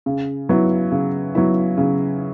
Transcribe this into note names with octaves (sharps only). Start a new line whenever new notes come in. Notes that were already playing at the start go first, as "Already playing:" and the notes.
C#3
F#3 B3 E4
C#3
F#3 B3 E4
C#3